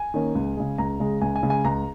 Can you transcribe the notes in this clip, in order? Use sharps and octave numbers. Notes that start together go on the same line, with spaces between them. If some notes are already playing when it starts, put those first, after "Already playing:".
Already playing: G#5
D#3 A#3 C#4
C#2
C#3 G#3
C#2 A#5
C#3 G#3
C#2 G#5
G#5
C#3 G#3
G#5
C#2 A#5